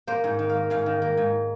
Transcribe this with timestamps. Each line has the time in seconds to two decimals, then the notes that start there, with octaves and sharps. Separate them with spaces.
0.07 A#3 C5
0.24 G#2
0.39 D#3
0.49 F5
0.55 A#3
0.70 G#2 F5
0.86 D#3
1.02 A#3
1.17 G#2